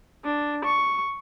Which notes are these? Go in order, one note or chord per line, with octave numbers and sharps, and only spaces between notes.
D4
C#6